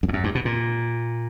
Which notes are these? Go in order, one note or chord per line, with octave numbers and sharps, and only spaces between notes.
F#2
E2
F#2
G2
B2
A#2